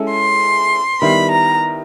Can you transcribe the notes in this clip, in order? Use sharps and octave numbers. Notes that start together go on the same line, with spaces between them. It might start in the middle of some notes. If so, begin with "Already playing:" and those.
Already playing: G#3 C#4 E4 A4
C6
D#3 G3 B3 E4 B5
A#5